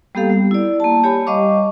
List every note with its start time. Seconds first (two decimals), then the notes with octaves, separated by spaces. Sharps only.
0.15 G3 A#3 B3 G4 A4 F5
0.30 G3
0.51 E4 D5
0.80 A#3 A5
1.04 G4 C#5 G#5 B5
1.27 G3 D#5 F5 C#6 D6